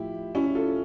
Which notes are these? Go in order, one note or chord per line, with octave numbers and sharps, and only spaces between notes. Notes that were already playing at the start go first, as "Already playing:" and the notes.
Already playing: A2 F3 E4 G4
C#4 E4
F4 A4